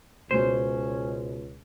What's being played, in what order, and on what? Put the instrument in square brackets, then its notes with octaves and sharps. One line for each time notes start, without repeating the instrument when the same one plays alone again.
[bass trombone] C#2 [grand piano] B2 G#3 [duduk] C#4 [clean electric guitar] C5